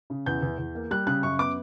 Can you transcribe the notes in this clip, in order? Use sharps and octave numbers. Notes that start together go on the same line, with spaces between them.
C#3
E2 G6
E2
E2
A#3
G3 F#6
C#3 F#6
F#2 C#6
B3 D6